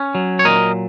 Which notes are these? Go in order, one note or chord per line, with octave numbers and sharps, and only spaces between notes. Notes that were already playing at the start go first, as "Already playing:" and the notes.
Already playing: C#4
F#3
C#5
A#2 A#4 D#5